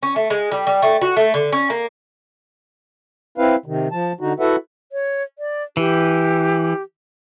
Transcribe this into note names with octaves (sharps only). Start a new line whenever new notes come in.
C#4
A3
G#3
G3
G3
A3
F#4
A3
D3
C#4
A#3
C4 E4 B4 F5
C3 D#3
F3 A5
D3 D#4 F#4
E4 F#4 A4 B4 E5 F#5
C#5
D5
E3 G4